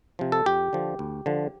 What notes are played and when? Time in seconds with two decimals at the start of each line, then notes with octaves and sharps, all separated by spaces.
0.19 C3 F3
0.32 A4
0.46 F2 G4
0.73 D3 F3
0.99 D2
1.26 D3 F3